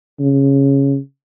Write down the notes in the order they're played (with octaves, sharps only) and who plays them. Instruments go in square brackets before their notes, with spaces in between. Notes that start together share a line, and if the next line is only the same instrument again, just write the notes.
[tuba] C#3